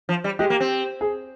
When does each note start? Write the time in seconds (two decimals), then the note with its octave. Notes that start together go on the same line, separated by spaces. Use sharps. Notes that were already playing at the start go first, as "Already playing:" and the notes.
0.09 F3
0.24 G3
0.39 G#3 G4
0.50 A#3
0.60 C4
1.01 G#4